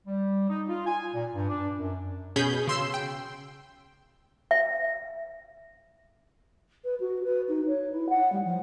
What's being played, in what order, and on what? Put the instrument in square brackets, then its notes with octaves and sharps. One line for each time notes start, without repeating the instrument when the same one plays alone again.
[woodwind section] G3
D#4
F4
G#5
A#2
G2
D4
F#2
[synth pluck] B2 C#4 G#4 B5 G6
C#3 C6 E6
G5
[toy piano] E5
[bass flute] B4
F#4
B4
D#4
C#5
E4
F#5
G3
F3